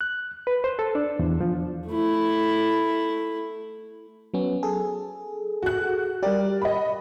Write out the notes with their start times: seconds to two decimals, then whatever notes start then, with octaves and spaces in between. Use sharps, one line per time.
0.01 F#6
0.47 B4
0.64 C5
0.79 A4
0.95 D4
1.19 E2
1.41 F3
1.88 A3 E4
4.34 F#3 B3 C#4
4.63 G#4 A4
5.63 F#4 F#6
6.23 G3 G4 A#4 D5
6.62 D#5 B5